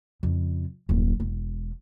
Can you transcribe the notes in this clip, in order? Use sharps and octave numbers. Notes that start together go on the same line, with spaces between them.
F2 C#3
D#1 F#2
E1